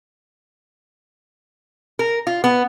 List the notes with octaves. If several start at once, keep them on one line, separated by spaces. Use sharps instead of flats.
A#4
F4
B3